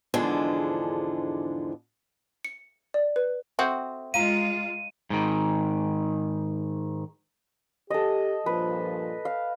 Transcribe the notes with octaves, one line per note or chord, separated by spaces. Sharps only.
E2 G#2 D3 F3 G#3 D4
C#7
D5
B4
C4 F#4 A4 E5
G#3 F4 F5 A#5 D#7
G#2 D#3
G4 A4 D#5
G2 A#2 F3 B4
F5